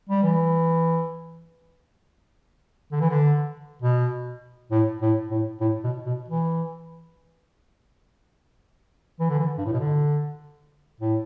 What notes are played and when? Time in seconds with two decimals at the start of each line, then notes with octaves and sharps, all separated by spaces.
0.09 G3
0.23 E3
2.92 D3
3.01 E3
3.10 D3
3.82 B2
4.71 A2
5.02 A2
5.31 A2
5.61 A2
5.84 B2
6.06 B2
6.28 E3
9.20 E3
9.30 D3
9.39 E3
9.58 G2
9.66 A2
9.73 B2
9.80 D3
11.01 A2